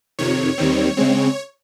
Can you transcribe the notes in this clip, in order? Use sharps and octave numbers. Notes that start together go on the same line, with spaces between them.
F2 C3 D#3 C#5
D#2 D#3 G3 C4
C#3 G#3 C4